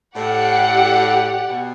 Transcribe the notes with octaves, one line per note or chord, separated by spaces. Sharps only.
A2 G4 D5 F#5
B2